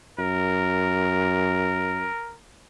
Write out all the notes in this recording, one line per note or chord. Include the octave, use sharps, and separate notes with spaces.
F#2 A#4